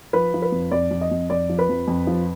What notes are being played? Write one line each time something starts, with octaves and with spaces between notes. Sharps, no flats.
F3 B4
F3
B4
F2
F2 D5
F2
D#5
F2
F2 D5
F3
B4
F2
F2
F3